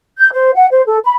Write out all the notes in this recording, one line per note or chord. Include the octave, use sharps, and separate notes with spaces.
G6
C5
F#5
C5
A4
B5